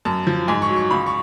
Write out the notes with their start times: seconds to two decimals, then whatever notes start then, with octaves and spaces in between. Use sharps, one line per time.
0.05 F#2 A5
0.27 F3
0.48 G#2 G#5
0.62 C#6
0.69 F#3
0.76 C#6
0.90 C#2 B5
1.06 C#6